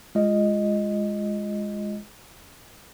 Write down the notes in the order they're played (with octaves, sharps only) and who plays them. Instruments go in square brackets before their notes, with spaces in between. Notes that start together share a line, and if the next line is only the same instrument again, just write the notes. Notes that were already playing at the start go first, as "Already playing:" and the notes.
[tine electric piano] G#3 F4 D#5